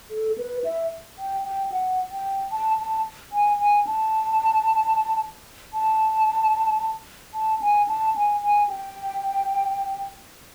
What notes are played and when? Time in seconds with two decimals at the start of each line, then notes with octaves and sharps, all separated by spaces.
0.11 A4
0.38 B4
0.64 E5
1.19 G5
1.45 G5
1.72 F#5
2.12 G5
2.52 A5
2.79 A5
3.32 G#5
3.59 G#5
3.87 A5
5.74 A5
7.34 A5
7.62 G#5
7.88 A5
8.16 G#5
8.43 G#5
8.69 G5